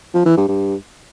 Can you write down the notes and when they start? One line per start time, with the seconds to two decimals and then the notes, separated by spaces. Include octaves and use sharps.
0.14 F3
0.26 E3
0.37 G2
0.48 G2